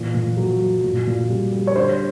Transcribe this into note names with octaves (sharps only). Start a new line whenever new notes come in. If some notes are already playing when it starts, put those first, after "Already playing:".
Already playing: A#2 E3 B4
A#2
F#3
F#3
A#2
A#2
G3
G3
C#5
D3 C5